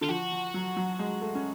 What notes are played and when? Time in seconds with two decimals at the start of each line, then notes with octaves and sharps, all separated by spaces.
0.01 D3
0.04 F4
0.09 F3 F#4
0.32 F3
0.54 F#3
0.77 F#3
0.99 G#3
1.21 A3
1.35 C#4